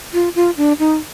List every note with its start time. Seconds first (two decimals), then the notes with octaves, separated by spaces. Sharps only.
0.14 F4
0.35 F4
0.57 D4
0.79 D#4